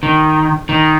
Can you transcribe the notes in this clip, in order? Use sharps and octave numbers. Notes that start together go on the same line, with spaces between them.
D#3
D#3